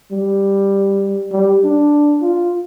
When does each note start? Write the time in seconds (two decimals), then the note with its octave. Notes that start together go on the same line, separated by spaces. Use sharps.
0.12 G3
1.32 G3
1.64 D4
2.22 F4